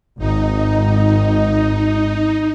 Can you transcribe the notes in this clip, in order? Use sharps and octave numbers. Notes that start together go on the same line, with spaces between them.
G#1 D#4